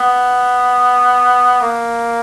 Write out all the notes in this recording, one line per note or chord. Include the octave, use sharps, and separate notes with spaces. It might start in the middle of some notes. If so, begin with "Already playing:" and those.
Already playing: B3
A#3